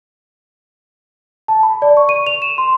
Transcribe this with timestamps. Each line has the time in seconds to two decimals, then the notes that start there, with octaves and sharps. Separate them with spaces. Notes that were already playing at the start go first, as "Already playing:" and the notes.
1.48 A5
1.63 B5
1.82 D5
1.97 C#6
2.09 D#7
2.27 F7
2.42 E7
2.58 C6